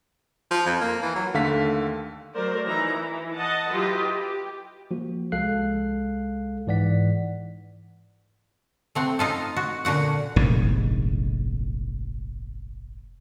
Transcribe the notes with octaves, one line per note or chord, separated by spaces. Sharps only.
F3
F2
A#3
E3
F#3
D#2 D3 A3 F5 F#5 B6
F#3 A3 A#4 C5 D5
E3 D#4 E4 A#5
E3
D#5 F#5 A5
F#3 E4 F4 G4 B4 D#5
G4
F3 A#3 F#4
C2 G#3 A4 F5 F#6 C7
G#2 E3 D5 F#5 B6
A3 C4 F#5
D#4 F4 A4
F#4
A#2 D3 F#4 F#5
F1 A#1 G#2 D#3